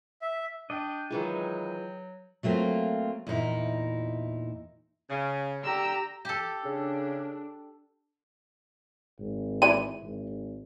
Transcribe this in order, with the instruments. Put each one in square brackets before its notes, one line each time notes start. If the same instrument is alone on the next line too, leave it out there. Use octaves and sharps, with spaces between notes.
[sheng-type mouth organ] E5
[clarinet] D4 [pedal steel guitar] D#5 G5 [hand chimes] D6
[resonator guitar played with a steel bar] D#3 E3 G#3 [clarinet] F#3 [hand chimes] F4 G#4 B4
[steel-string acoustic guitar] F#3 A3 A#3 C4 F4
E2 A#2 D#4 E4
[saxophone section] C#3
[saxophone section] D3 [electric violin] G4 E6 [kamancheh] A#5
[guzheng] G4 A4
[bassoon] C#3 [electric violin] D4
[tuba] G#1
[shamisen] E3 E4 D5 [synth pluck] D#7
[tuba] G#1